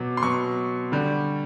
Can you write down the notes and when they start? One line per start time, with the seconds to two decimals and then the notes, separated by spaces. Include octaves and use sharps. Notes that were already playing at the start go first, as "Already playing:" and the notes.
Already playing: B2 F#3 D6
0.17 C6
0.23 B2 F#3 C#6
0.92 D3 G3